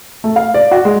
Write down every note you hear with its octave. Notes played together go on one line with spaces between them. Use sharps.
A3
F5
D5
F#4
G#3